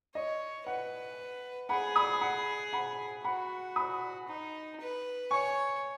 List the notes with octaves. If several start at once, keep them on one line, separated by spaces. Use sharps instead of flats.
C#5 D#5
B4 F#5
G#4 F#5 B5
B5 D#6
F#5 B5
F#5 B5
F#4 F#5 B5
B5 D#6
D#4
B4
C#5 G#5 C#6